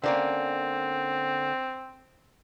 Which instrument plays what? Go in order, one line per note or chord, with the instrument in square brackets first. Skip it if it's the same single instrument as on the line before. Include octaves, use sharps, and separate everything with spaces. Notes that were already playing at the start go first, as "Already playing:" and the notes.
[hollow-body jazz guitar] D3 A#3 C#4 [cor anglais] C4